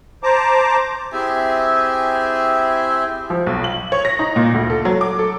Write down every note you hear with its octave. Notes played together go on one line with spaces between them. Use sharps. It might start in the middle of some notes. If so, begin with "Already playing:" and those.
C5 A5 A#5 D6
C4 E4 G4 G#4 E5 G#5
F3
B1
F#7
C#5
A#6
D#4
A#2
D2
A4
F#3
D6
A4